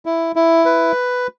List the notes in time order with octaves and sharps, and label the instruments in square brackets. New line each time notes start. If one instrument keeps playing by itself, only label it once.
[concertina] E4
E4
B4